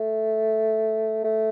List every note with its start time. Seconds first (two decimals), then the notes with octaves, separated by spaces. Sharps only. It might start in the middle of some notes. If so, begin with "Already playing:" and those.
Already playing: A3
1.24 A3